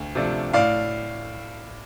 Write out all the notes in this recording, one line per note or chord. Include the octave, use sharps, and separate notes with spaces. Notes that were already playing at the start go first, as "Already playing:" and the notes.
Already playing: D2
C3 F3 A3 D4
A2 D5 F5